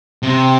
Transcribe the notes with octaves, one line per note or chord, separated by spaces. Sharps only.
C3